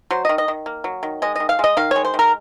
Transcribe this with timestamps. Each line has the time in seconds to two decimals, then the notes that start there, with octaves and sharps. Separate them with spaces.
0.11 F#3 C5
0.25 D#5
0.29 D#3
0.38 D#5
0.48 D#3
0.66 A#3
0.84 F#3
1.03 D#3
1.22 G#3 D#5
1.35 D#3 D#5
1.49 F5
1.59 G#3 D#5
1.77 D#3 F5
1.91 G#3 C#5
2.05 C5
2.14 D#3
2.19 A#4